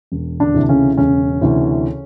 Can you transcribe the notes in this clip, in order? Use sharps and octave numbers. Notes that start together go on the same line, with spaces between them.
E1
D3 D4
D2 C3 E3
C#3 C#4
E1 C#3 C#4
D2 C3 E3